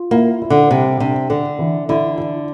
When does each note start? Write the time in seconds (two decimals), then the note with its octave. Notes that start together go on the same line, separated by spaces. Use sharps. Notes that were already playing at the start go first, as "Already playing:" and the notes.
Already playing: F4
0.11 A#3 E4
0.42 E4
0.50 D3
0.71 C3 G3
1.00 C3 D4
1.30 D3 A4
1.59 E3
1.89 D3 E4
2.18 E4